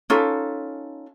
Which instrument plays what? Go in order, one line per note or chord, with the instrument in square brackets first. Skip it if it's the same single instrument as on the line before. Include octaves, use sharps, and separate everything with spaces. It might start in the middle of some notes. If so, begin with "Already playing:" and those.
[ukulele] C#4 D#4 F4 A4